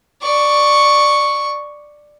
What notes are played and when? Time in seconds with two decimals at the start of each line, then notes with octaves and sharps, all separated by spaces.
0.23 D5 C#6